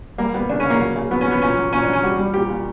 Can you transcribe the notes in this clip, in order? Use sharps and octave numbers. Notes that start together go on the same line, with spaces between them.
G3 A#3
G3 B3
C#3 D4
C#3 C#4
A#3
F#3
C#3
F#3 B3
C#4
F#3 B3
A#2 C#4
F#3
A#2 C#4
F#3 D4
C#4
G3 F#4
G3
A#2 G4
A#2